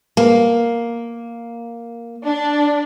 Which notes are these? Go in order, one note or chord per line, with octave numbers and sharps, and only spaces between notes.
A#3
D4